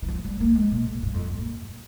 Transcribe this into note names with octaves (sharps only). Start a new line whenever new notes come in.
D#3
F3
G3
A#3
G#3
A#2
G#2
G2
F2
G2
A#2